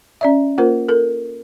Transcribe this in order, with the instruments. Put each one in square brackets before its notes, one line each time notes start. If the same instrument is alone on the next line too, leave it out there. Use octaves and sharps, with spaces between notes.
[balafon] C#4 D5 E5
A#3 F4 A#4 C5
A4 A#4